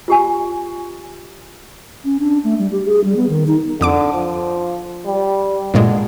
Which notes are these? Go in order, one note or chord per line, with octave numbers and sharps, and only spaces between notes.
F4 G4 G#5
C#4
D4
A3
G3
G4
G#4
G3
B3
D#3
D#4
F2 D3 D6 D7
F3
G3
G2 A#2 D3 G#3